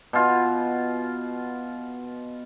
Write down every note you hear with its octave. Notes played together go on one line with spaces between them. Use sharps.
B2 F4